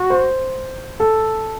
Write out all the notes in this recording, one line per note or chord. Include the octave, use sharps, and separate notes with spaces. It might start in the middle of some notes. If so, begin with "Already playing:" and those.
Already playing: F#4
C5
A4